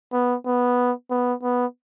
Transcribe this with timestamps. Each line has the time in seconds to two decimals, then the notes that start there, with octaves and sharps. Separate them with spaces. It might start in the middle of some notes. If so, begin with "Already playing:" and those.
0.13 B3
0.46 B3
1.11 B3
1.43 B3